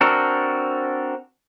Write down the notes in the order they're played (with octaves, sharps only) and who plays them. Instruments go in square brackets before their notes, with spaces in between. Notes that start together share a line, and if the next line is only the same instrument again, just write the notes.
[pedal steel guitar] C4 D4 F#4 A4 A#4